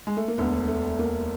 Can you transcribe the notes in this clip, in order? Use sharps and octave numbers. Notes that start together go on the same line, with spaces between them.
G#3
A3
A#3
E1 D2 D3 B3
A3
A#3